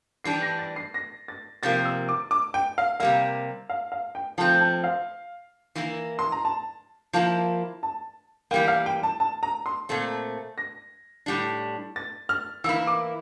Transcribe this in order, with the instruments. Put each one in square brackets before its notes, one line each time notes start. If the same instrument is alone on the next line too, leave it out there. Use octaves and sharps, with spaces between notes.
[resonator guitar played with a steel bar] E3 G3 D4 [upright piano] C7
[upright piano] A#6
A6
C7
A#6
A6
[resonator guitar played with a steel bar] C3 F3 A#3 [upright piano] A6
[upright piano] E6
D6
D6
G5
F5
[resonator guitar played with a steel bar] C3 G3 A#3 [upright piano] F5
[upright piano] F5
F5
G5
[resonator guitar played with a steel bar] F3 A3 C4 [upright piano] A5
[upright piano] A5
F5
[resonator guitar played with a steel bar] E3 A#3 E4
[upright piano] C6
A#5
A5
[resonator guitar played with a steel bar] F3 A#3 E4 [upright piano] A5
[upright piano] A5
[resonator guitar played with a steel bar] A#3 [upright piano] G5
[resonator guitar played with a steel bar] E3 G3
[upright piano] F5
G5
A5
A5
A#5
C6
[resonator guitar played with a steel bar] A#2 A3 C4
[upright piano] A#6
[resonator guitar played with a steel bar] A2 G3 D4
[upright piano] A6
F6
[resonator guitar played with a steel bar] E3 A#3 E4 [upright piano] E6
[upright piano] D6